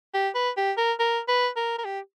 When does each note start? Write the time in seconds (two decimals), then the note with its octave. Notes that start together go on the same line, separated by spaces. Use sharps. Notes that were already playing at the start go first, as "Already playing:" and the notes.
0.14 G4
0.35 B4
0.57 G4
0.78 A#4
1.00 A#4
1.28 B4
1.56 A#4
1.78 A#4
1.85 G4